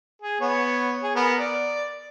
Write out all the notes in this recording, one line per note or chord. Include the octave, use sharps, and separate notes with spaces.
G#4
B3 C#5
G#4
B3 A#4
D5